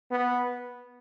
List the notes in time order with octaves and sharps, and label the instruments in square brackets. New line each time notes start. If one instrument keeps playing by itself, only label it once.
[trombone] B3